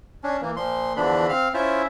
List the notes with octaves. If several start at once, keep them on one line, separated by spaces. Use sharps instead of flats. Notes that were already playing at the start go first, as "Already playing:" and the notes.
C#4 D4
E3 A#3
A#2 F3 C6
E2 D3 E3 F3 D4 B5
C4 F5 F6
C#4 E4 F4 C5 E5